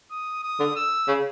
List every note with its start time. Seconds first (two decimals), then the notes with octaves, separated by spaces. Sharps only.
0.11 D#6
0.43 D#6
0.59 D3
0.76 E6
1.08 C#3